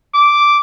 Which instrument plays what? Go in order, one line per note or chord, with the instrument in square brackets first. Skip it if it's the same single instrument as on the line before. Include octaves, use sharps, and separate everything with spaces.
[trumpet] D6